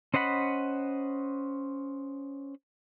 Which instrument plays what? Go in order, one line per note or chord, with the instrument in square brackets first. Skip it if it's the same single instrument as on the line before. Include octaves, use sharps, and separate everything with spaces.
[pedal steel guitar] C#4 C5 D#5 F#5 B5